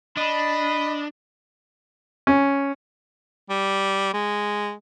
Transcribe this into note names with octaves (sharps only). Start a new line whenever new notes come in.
D4 D#5 B5
C#4
G3
G#3